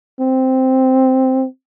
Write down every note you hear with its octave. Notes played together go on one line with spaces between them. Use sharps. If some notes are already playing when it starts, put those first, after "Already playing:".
C4